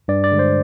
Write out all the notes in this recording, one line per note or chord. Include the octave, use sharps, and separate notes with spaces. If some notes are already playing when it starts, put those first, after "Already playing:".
G2 D5
D5
D3 G#3
C5